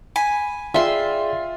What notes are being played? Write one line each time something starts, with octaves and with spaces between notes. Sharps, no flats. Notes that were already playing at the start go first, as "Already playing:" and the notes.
G#5 B5
F4 G#4 D5 E5 G5 C6